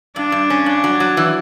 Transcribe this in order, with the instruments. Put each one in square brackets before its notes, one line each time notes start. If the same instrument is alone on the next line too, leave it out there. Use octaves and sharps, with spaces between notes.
[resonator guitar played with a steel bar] G2 [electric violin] D4
[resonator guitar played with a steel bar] G2
C#4
[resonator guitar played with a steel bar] G2 [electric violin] D4
[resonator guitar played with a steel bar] F#3
F#3
E3